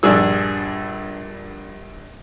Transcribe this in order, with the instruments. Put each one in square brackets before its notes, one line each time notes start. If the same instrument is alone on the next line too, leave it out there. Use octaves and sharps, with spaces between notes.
[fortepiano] A#1 G2 D4 G#4 E6